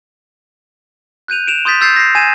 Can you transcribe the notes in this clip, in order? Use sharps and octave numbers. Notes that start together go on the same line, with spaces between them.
F#6 G6 D#7 F7
D7 E7 F7
C6 D#6 G6 A6 B6
E6 G6 A6 C7
A#6 C7
G#5 G#6 D#7 E7